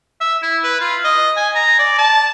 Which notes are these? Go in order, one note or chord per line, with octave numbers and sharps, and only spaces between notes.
E5
E4
B4
F4
D#5
G#5
A#5
D5
A5